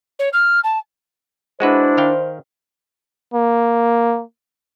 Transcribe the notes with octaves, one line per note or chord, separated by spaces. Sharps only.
C#5
F6
A5
G#3 D4 E4 F#4 B4 C5
D#3 F5 G5
A#3